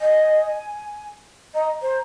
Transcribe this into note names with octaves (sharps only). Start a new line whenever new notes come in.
D#5 G#5
D#5 A#5
C5